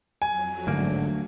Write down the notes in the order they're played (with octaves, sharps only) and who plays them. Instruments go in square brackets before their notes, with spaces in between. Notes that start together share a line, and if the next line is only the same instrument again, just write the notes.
[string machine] F2 F#3 [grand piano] G#5
[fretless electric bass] A1 G#2 D3 [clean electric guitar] D2 A#3